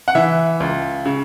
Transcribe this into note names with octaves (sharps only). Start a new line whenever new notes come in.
F#5
E3 E5
C#2
C#3